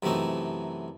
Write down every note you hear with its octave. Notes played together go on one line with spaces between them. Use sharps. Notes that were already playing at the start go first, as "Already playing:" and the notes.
F#2 C3 E3 A3 D#4